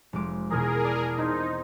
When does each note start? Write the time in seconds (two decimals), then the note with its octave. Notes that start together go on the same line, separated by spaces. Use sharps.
0.13 F1 G#3 D6
0.50 E2 B2 G#4 A#4
0.85 D5 A5
1.18 C4 D#4